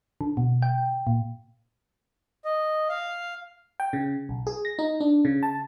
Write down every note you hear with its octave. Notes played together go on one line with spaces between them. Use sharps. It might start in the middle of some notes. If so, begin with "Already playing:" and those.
D3
B2
G5
A#2
D#5
F5
G5
C#3
B1
G#4
A#6
D#4
D4
C#3
A5